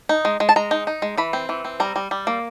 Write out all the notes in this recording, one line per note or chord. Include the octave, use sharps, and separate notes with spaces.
D#4
G#3
G#3
A5
G#3 A#5
D#4
D#4
G#3
E3 B5
C4
E3
C4
G3 A#5
G3
G3
A#3